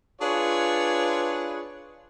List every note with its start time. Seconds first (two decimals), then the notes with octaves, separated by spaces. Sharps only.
0.21 D4 F4 G#4 B4 C#5